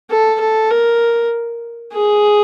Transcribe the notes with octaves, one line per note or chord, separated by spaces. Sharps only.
A4
A4
A#4
G#4